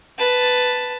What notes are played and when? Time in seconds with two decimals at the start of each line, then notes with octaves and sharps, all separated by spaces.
0.19 B4 A5